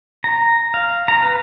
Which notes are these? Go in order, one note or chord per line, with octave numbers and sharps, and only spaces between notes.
A#5
F5
A#5
B4